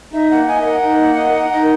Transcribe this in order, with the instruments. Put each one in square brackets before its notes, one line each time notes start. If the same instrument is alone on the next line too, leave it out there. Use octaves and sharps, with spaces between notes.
[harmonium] D#4 [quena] E5
[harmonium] A#3 [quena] F#5
[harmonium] D#5 [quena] G#5
[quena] E5
[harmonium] A#4 [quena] F#5
[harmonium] D#4
A#3
D#5
A#4
[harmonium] D#4 [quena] D#5